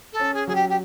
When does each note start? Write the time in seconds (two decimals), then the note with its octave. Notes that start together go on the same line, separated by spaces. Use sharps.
0.13 A4
0.20 C#4
0.34 G#4
0.47 F#3 G#4
0.55 G4
0.69 G4